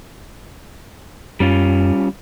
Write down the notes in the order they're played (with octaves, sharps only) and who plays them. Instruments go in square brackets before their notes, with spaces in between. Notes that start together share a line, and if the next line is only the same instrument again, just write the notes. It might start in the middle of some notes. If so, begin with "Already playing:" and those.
[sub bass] F#2 [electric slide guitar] G3 C#4 F4